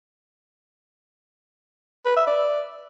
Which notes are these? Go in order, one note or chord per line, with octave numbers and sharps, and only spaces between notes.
B4
E5
D5